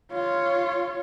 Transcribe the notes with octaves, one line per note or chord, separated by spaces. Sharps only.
F4 C#5